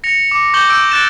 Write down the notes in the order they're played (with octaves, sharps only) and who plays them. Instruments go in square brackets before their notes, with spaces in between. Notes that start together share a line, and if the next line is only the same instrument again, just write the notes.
[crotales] A#6 C#7 F7
D6
C#6 D6 G6 A#6 F#7 G7
E6 G6 D7
F#6 A6 A#6 D7 E7